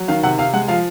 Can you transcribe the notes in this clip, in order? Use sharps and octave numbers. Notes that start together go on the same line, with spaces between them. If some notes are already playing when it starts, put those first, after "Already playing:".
Already playing: F#3
D#3 F5
C3 F#5
C3 F5
G#3 F#5
F3 F5